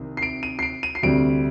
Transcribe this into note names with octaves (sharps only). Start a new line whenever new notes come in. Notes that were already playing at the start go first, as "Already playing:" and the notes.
Already playing: C2 C3 D#3 C4
C7
D7
D#7
C7
D7
D#7
C7
D2 C3 G3 C4 D7